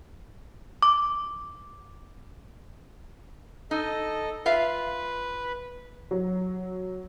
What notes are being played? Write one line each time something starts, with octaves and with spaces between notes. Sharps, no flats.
D6
D#4 A4 D#5
F4 B4 E5 F5
F#3